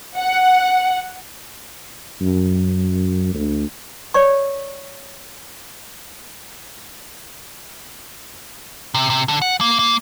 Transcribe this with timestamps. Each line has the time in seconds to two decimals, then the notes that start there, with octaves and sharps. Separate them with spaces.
0.18 F#5
2.21 F#2
3.34 D2
4.14 C#5 D5 C#6
8.94 C3
9.10 C3
9.28 D3
9.42 F#5
9.61 A#3
9.79 A#3